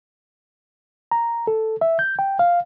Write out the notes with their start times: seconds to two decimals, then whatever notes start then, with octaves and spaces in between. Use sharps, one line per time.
1.11 A#5
1.47 A4
1.81 E5
1.99 G6
2.19 G5
2.39 F5